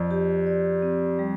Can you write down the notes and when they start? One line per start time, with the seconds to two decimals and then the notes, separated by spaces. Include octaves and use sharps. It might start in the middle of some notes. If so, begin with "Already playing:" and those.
Already playing: F2 D5
0.11 G4
0.46 D5
0.82 C4
1.19 G3